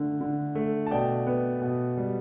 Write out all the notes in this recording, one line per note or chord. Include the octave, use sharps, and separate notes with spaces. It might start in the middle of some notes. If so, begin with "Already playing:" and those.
Already playing: D3 A3
D3
A3
A5
B2 D5 G5
B3
B2
G3